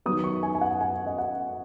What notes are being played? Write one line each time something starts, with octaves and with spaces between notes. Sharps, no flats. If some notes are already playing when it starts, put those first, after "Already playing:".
D#3 F#3 B3 D#6
C#6
G#5
G#5
F#5
G#5
D#5
F#5